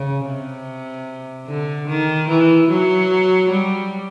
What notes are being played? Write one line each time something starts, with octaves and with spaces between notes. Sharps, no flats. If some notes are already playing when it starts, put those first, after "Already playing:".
Already playing: C#3
C3
D3
D#3
E3
F#3
G3